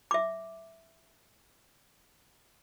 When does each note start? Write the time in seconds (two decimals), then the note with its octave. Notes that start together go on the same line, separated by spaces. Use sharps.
0.11 E5 D6